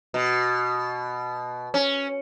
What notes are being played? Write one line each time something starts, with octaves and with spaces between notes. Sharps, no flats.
B2
C#4